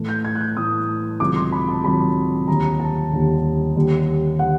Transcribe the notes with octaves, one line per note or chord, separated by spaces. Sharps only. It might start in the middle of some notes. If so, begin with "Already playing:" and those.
Already playing: A2 E3 A3
G6
G#6
F#6
G6
A2 E3 A3 D#6
C#2 C3 D#3 F#3 D6
C6
B5
A5
C#2 C3 D#3 F#3 B5
D#2 D3 G3 A#5
A5
D#2 D3 G3
D#2 D3 G3
D3 F#5